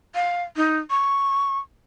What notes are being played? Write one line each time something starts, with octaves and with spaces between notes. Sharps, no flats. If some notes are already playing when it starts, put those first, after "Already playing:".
F5
D#4
C#6